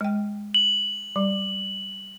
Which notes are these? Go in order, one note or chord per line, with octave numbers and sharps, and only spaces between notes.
G#3 G5
F#7
G3